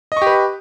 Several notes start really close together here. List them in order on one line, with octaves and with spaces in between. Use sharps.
D#5 C#6 G4 B4